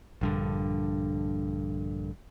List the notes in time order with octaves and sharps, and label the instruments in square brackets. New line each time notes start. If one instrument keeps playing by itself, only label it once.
[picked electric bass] A#1 G2 D3